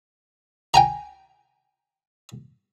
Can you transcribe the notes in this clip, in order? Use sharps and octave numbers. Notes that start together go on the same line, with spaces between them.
G5 G#5 A#5